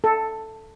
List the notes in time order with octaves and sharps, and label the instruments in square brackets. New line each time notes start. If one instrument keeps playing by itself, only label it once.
[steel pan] A4